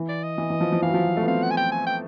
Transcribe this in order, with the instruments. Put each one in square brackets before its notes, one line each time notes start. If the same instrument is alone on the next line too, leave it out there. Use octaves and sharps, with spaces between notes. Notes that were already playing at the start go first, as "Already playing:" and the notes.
Already playing: [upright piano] E3
[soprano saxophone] D5
D#5
[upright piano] E3
E3
F3
F3
[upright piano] E3 [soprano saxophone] F5
[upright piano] F#3
F3
F#3
A3
B3
[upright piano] C4 [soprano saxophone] F5
[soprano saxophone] F#5
G#5
G5
G#5
G5